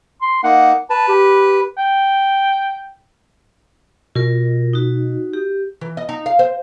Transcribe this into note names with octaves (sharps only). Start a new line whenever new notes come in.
C6
A#3 D#4 F#5
B4 A5
G4
G5
B2 F4 A#4
D#4 F#4
G4
E3
D#5
D#4
F5
C5